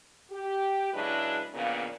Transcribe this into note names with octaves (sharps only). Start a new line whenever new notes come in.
G4
C#3 F#3 G#3 D4 E4 B4
F2 A#2 C#3 A#3 B3 D4